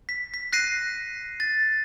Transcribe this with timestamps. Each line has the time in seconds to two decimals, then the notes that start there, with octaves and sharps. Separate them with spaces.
0.09 B6
0.34 B6
0.53 F#6 A#6 C7 D#7
1.40 A6